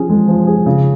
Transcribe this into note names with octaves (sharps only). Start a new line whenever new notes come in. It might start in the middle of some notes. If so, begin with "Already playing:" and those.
Already playing: F3 C#4 G#4
G#3
F3
G#4
C#3